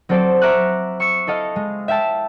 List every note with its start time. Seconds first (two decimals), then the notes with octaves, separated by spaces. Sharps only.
0.09 F#3 C4 F4 A4 C5 D5
0.42 E5 A#5 C#6 D6 F6 F#6
1.00 C#6 E6 C7 C#7
1.27 E4 A4 D#5 F5
1.56 G#3
1.88 E5 F5 G5 A5